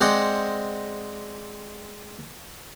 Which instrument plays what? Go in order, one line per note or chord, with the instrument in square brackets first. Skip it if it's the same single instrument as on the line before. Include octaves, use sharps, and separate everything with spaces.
[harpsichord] G#3 C4 C5 D5 D#5 F#5